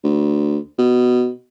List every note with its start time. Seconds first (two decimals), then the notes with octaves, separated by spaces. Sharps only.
0.04 D2
0.78 B2